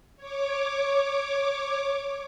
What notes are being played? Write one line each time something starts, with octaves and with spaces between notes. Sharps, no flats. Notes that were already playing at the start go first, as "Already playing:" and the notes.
C#5 D6